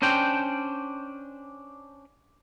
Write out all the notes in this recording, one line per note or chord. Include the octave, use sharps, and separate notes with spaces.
C#4 D4 C5 G5